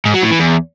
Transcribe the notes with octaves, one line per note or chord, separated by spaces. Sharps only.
G#2
F#3
A2
E3
E2